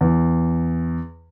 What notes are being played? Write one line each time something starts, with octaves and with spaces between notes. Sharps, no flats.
E2